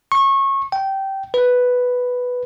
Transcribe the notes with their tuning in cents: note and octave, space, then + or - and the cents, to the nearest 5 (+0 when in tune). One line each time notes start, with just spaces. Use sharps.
C#6 -25
G5 -15
B4 +0